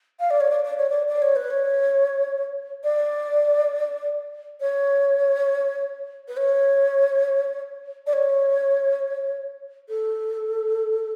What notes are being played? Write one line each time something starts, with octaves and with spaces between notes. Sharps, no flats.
F5
D5
C#5
D5
D5
C#5
D5
D5
C#5
B4
C#5
D5
C#5
B4
C#5
D5
C#5
A4